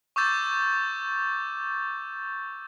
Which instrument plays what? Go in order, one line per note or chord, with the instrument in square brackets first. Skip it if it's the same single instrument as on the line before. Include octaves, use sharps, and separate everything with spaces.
[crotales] C#6 D6 E6 G6 A6 E7